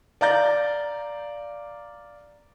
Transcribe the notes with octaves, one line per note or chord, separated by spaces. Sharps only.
D5 F5 A#5 G6 A6